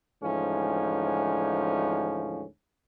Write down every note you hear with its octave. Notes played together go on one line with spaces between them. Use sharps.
D2 G#2 E3 F3 C#4